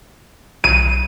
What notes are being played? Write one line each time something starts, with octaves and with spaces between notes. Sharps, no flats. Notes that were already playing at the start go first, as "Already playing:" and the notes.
B1 D#7